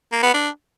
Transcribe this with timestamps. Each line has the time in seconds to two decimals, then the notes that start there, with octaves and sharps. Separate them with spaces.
0.12 A#3
0.23 B3
0.34 D4